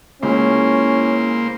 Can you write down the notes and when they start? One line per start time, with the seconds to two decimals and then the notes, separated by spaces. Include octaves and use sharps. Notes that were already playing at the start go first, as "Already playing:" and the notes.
0.23 C#2 A#3 C#4 E4 C5